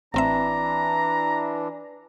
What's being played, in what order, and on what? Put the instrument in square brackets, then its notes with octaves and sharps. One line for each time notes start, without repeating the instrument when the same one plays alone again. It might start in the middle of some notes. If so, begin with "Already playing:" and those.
[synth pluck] A1 C4 E5 [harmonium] E3 D4 [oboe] A#5